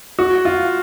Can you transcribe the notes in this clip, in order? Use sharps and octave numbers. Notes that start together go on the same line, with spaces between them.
F#4
F4